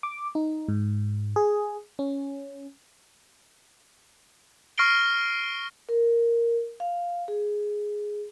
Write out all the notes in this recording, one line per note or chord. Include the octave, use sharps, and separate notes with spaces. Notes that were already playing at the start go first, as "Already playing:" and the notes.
D6
D#4
G#2
G#4
C#4
C#6 F6 A#6 C7 D7 G7
A#4
F5
G#4